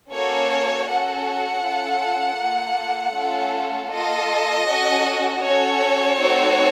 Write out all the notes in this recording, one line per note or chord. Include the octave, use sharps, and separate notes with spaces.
A#3 C#4 F#4 A4 C#5
C#4 F#4 A4 F#5
C#4 F4 A4
A#3 F4 A4
A3 C#4 F4 A4
A#3 F4 A4 D#5
C#4 F#4 A4
C#4 F#4 A4 C#5
A3 C4 D#4 F#4 A4